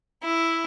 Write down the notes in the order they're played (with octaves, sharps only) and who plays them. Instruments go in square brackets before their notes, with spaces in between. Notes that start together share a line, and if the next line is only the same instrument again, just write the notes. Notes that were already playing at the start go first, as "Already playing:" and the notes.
[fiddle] E4